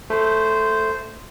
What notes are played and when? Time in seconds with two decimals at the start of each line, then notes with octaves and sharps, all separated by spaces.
0.10 A3 C5